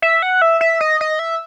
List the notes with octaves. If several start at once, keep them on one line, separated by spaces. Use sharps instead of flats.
E5
F#5
E5
E5
D#5
D#5
E5